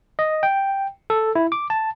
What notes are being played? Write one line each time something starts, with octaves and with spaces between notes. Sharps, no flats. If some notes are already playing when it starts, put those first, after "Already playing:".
D#5
G5
A4
E4
D6
A5